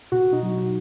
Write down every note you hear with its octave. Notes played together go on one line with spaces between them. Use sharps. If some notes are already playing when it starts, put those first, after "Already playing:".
B2 F#4
B2
D#4
F#3
F#3